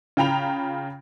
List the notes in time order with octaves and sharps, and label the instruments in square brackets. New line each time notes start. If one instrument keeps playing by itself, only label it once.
[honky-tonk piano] C#3 F4 G5 A#5 B5 F7